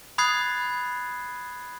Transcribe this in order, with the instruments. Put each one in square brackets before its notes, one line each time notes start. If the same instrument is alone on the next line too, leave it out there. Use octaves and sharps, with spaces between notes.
[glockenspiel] B5 D#6 F#6 G#6 A6 C7